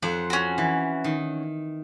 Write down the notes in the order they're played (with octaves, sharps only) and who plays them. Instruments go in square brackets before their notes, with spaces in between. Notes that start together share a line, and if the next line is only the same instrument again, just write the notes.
[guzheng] F2 C5 F#5
[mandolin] C#4 F#4
[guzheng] E3
D#3